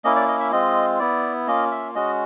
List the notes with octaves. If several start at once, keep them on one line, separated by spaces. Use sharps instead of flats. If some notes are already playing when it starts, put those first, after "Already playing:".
A#3 C#4 E4 D#5
D5
D#5
E5
G#3 C4 F4 D#5
B3 E4 D5
A#3 C#4 F4 D#5
E5
G#3 C#4 F#4 D#5